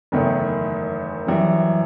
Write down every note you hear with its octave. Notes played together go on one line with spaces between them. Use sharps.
F#1 E2 D#3 A3
F#2 E3 G3